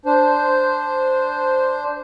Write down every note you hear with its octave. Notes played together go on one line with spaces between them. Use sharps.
D4 C5